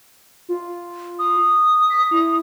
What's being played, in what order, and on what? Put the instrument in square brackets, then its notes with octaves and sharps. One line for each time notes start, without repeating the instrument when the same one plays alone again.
[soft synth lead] F4
[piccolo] D#6
[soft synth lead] B6
E4